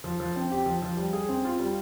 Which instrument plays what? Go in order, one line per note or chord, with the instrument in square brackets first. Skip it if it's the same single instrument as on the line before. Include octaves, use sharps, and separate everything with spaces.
[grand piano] F3
F3
C4
G4
F3
F3
G3
G#4
C4
F4
G3